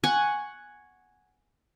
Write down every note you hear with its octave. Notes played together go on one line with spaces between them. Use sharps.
F#5 G#5 C#6